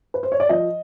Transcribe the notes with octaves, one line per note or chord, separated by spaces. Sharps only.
B4
C5
C#5
D5
F3 D#5